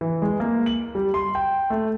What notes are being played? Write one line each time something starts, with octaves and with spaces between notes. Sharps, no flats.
E3
G#3
A#3
F#7
G3
C6
G5
A3